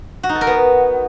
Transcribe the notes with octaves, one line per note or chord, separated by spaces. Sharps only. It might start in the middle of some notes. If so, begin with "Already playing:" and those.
F#4
D#4
A4
A#4
B3